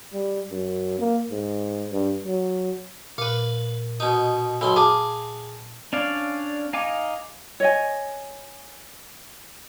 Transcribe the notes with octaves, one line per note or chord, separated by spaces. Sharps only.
G3
F#2
A#3
G#2
G2
F#3
A#2 B4 F5
B2 D#4
B1 F#2 B5 C6
G#4 F5 A5 D6
C#4 D4 D5 F5
D#4 F5 G#5 D6
C#5 D#5 G#5